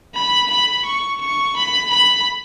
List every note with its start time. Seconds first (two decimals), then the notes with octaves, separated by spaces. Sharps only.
0.15 B5
0.50 B5
0.86 C#6
1.21 C#6
1.56 B5
1.91 B5